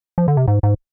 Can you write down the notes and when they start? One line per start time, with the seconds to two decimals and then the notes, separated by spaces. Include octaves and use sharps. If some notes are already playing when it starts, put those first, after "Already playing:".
0.18 F3
0.28 D3
0.37 C3
0.48 G#2
0.63 G#2